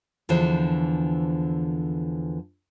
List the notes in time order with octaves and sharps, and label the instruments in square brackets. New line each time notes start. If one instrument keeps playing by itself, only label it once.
[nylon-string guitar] E2 D3 E3 F3 C5 E5